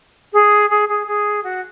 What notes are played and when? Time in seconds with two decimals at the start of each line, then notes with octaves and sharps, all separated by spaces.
0.33 G#4
0.70 G#4
0.88 G#4
1.07 G#4
1.44 F#4